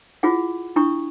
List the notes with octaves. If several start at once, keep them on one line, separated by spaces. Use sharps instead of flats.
E4 F4 G#4 F#5
D4 E4 A#5 C#6 D#6